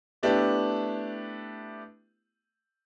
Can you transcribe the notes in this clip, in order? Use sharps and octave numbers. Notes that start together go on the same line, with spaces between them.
A3 B3 D4 E4 G4